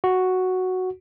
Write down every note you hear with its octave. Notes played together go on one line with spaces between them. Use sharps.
F#4